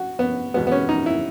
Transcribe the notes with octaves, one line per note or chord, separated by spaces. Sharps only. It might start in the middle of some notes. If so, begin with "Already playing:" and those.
Already playing: F#4
B3
E2 B2 G#3 B3
B3
C#4
D#4
E4